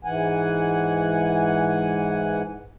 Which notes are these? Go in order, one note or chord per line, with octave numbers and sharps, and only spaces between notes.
G#2 E3 F#5 G#5